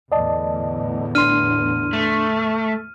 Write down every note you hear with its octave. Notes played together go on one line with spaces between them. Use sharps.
E2 A2 D3 D5 D#5 A5
D4 C6 F6 D#7
A3